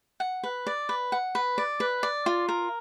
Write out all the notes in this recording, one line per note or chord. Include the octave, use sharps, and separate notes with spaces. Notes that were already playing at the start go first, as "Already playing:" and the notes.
F#5
B4
D5
B4
F#5
B4
D5
B4
D5
F4
A#4